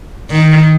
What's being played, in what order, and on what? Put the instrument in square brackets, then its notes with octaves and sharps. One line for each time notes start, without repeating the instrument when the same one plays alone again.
[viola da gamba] D#3